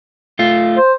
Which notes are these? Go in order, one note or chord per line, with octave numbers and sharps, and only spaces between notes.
A3 F4
C5